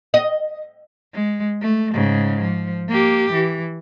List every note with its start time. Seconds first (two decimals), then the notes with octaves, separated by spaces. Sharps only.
0.14 D#5
1.14 G#3
1.62 A3
1.93 G#2 C#3
2.41 F3
2.89 A#3 G4
3.33 E3